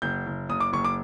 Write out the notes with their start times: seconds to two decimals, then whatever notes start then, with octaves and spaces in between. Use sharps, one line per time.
0.02 F#1 G6
0.26 F#1
0.49 F#1 D#6
0.60 D6
0.73 F#1 C#6
0.84 D6